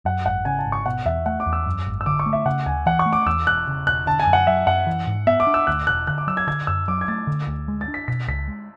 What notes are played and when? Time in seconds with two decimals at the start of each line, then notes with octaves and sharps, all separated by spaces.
0.05 F#2 F#5
0.26 G#1 F#5
0.45 C#3 G#5
0.59 A5
0.66 G#1
0.72 C#6
0.86 B2 F#5
1.05 E2 E5
1.26 A3 F#5
1.40 D6
1.46 E2
1.53 E6
1.66 F#2
1.87 G#1
2.01 E6
2.06 D3 D6
2.19 C#6
2.26 A3
2.33 E5
2.46 C#3 F#5
2.66 D2 G#5
2.86 E3 F#5
2.99 C#6
3.06 A3
3.13 D6
3.26 E2 E6
3.47 E1 F#6
3.67 C#3
3.87 E1 F#6
4.07 D3 A5
4.20 G#5
4.27 F#2
4.33 F#5
4.47 F#3 E5
4.67 F#2 F#5
4.87 E3
5.07 G#2
5.27 B3 E5
5.40 D6
5.47 D4
5.54 E6
5.67 D2 F#6
5.87 E1 F#6
6.07 D3 F#6
6.18 D6
6.27 F#3 E6
6.37 G#6
6.47 D3 G#6
6.67 F#2 E6
6.88 F#3 D6
7.01 G#6
7.08 A3 A6
7.27 D3
7.47 D2
7.68 G#3
7.81 A6
7.88 D4
7.94 B6
8.08 B2 B6
8.28 C#2 B6
8.48 G#3